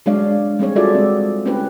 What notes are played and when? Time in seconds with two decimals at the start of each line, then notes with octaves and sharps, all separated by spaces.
0.06 F#3 G#3 D4 C#5 D5 F5
0.59 G3 C4 G#4 C#5
0.76 F4 F#4 G#4 A4 D5 E5
0.95 G#3 C4
1.45 C4 C#4 E4 G4 B4